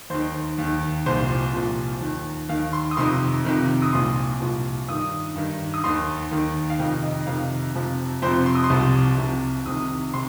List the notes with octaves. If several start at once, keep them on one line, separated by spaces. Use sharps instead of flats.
D#2 D#3 C5
D#2 D#3
C2 A#2 F3 C5
C2 A#2 F3
D#2 D#3
D#2 D#3 F5
C6
D#6
F2 C3 D#3 C6
F2 C3 D#3
D#6
C2 A#2 F3 C6
C2 A#2 F3
G2 D#3 D#6
G2 D#3
D#6
D#2 D#3 C6
D#2 D#3
F5
F2 C3 D#3 G5
D#5
F2 C3 D#3 F5
F2 C3 F3
F2 C3 F3 C5
C6
D#6
C6
C2 C3 F3
C2 C3 F3
C2 C3 D#3 D#6
C3 C6